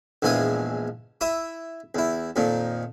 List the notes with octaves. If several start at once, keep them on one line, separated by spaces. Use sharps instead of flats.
A#1 E2 E3 G#3 G#5 D#6
E4 E5 D#6
E2 E4
F2 A#2 D#3